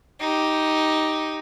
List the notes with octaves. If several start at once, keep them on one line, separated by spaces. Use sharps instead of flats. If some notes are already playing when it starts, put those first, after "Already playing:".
D#4 G4